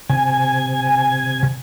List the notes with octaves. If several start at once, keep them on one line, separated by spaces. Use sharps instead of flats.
C3 G#5